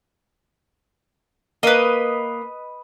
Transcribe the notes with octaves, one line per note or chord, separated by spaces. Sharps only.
A#3 B4 D#5